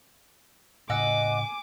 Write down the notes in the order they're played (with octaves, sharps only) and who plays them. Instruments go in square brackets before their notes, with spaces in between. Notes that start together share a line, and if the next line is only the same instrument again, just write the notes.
[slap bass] A2 C#3 [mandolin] D#5 F#5 E6 [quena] G#5 [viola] D6